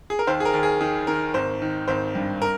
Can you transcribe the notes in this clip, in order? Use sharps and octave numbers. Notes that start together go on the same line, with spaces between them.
G#4
A#4
D#2 C5
G#4
A#4
D#2
G#4
D#3 G#4
D#3 A#4
G#1 C5
D#3
G#1 C5
G2
A#4